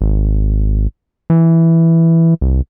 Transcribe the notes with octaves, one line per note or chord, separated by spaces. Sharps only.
G#1
E3
C2